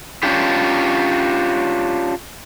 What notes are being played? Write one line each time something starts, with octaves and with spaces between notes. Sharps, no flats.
C#4 D4 F4 G4